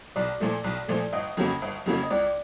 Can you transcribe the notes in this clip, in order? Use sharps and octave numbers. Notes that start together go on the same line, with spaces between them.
B1 D5
A#2 F3 A3
B1
A#2 F3 A3
G1 D#5
F2 C#3 F#3 A#3
G1
F2 C#3 F#3 A#3
D#5
C#2 D5